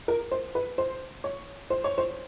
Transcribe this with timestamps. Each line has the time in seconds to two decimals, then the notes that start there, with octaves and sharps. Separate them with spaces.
0.08 A#4
0.31 C5
0.55 B4
0.78 C5
1.24 C#5
1.70 C5
1.84 C#5
1.98 C5